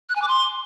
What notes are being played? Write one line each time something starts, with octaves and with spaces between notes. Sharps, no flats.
F#6
G#5
D6
C6